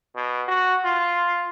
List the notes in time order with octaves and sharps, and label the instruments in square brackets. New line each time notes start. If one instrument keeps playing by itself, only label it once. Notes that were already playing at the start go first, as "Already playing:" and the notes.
[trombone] B2
F#4
F4